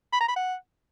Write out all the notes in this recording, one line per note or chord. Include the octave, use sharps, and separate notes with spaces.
B5
A#5
B5
F#5